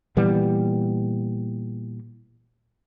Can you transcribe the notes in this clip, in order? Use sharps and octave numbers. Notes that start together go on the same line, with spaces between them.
A#2 E3 G3 B3